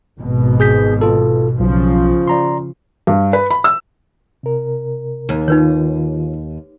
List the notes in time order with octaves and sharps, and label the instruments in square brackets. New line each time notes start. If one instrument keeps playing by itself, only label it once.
[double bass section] G#1 B2
[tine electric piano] G#4 G6 B6
F4 A4
[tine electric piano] B1 [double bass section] C#3 F3
[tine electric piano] D5 A#5 C6
[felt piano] G2
B4
B5
E6
[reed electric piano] C3 A#4
[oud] D#2
[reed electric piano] D#3 F4 [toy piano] D#4 B4 C#5